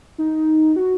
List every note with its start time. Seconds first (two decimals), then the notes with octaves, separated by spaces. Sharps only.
0.18 D#4
0.76 F#4